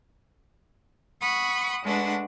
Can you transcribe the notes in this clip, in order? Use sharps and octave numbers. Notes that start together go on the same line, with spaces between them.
F#5 B5 C#6 D#6
G#3 A3 D4 B4 F#5